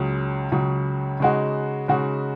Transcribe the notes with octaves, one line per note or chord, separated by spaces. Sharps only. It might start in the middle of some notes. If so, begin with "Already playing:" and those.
Already playing: C#2 C#3 F#3
C#2 C#3 F#3
C#3 G#3 D#4 F#4
C#3 G#3 D#4 F#4